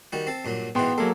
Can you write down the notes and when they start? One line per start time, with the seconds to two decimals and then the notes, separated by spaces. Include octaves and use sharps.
0.12 D#3 G3 F#4
0.27 C4 A4
0.45 G2 A#2 F#3
0.75 G#2 B2 E3 B3 G5 C6
0.98 F#3 G#3 A#3 A4